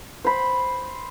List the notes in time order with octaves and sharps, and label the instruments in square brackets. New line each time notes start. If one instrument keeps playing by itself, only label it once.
[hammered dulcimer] C5 B5